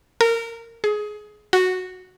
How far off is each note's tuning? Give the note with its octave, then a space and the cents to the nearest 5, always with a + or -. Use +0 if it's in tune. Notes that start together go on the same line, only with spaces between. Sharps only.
A#4 -20
G#4 +20
F#4 -5